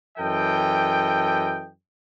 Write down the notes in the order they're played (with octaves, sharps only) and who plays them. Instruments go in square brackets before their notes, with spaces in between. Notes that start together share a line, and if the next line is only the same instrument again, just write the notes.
[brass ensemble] F#2 E3 A4 D#5 G5